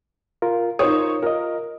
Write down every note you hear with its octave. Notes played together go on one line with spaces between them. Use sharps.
F4 A#4
D#4 F4 A#4 C5 C#5 D#6
F4 A#4 D#5